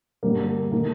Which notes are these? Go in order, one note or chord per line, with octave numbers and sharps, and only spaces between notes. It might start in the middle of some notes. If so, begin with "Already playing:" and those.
G2 D3 G3 A#3
A#3
D#3 A3 A#3